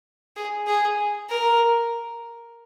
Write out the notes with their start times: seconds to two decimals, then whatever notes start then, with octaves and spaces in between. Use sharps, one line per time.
0.36 G#4
0.67 G#4
1.30 A#4